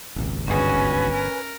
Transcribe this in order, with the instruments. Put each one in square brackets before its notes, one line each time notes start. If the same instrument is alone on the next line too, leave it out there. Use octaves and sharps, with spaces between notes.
[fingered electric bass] D#1 G#1 C#2
[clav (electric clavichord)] G1 G#4 [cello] C#4 F#4 [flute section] B4 G#5
[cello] A#4